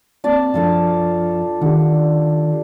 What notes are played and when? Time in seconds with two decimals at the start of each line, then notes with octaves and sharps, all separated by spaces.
0.24 A#3 C4 D5 A5
0.54 F#2 F3 D4 F4 A4 F5
1.61 D3 D#3 G4